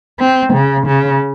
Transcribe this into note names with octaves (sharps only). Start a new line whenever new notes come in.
C4
C#3
C#3